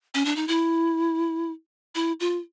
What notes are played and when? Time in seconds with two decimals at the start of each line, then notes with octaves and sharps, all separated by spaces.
0.14 C#4
0.25 D4
0.36 D#4
0.48 E4
1.95 E4
2.20 F4